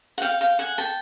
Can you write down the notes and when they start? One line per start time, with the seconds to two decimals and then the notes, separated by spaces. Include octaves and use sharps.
0.18 F#5
0.21 F5 G5
0.41 F5 G5
0.59 F#5 G#5
0.78 G5 A5